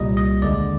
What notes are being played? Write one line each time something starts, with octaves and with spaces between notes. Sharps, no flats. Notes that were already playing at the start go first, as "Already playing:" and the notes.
Already playing: C2 A#2 G3 D#5
D#5
D#2 D3 G#3 D5